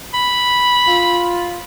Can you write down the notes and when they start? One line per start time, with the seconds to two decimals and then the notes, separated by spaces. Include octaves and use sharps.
0.14 B5
0.87 F4